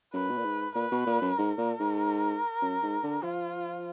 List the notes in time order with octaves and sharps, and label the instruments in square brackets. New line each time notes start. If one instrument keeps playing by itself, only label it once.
[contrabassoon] F#2 [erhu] B4
[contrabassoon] B2
A#2
G#2
[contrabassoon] A#2 [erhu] B4
[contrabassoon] B2
A#2
F#2
[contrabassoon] G#2 [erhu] A#4
[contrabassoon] A#2
G#2
F#2
G#2
D3
[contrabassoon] F3 [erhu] F4